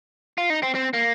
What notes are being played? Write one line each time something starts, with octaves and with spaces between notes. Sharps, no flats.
F4
D#4
C4
C4
A#3